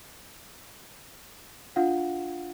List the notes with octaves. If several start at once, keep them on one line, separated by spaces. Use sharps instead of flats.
D4 F4 F5 F#5